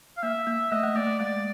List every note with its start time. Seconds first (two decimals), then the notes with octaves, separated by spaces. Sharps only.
0.17 F5
0.23 A#3 E5
0.47 A#3
0.72 A3 D#5
0.84 A3
0.95 A#3 D5
1.07 A3
1.19 G#3 D5